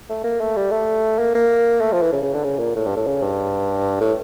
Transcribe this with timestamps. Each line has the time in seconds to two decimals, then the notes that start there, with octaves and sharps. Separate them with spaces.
0.09 A3
0.24 A#3
0.40 A3
0.56 G3
0.71 A3
1.19 A#3
1.35 A#3
1.81 A3
1.92 F3
2.02 E3
2.12 C#3
2.23 C#3
2.34 D3
2.44 C#3
2.59 A#2
2.75 A2
2.86 G2
2.97 A2
3.07 C#3
3.23 G2
4.00 A2